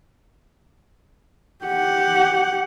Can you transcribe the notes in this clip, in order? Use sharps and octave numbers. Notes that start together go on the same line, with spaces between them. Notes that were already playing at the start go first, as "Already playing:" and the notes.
G4 F#5